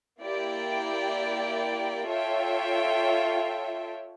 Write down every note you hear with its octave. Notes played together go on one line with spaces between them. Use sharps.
A#3 E4 G4 D5 G5
F4 A4 C#5 E5 G5